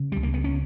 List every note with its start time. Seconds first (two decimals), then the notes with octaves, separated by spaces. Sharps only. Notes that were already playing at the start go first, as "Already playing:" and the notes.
Already playing: C#3
0.12 C#2 G3
0.23 A#3
0.34 B3
0.44 C#4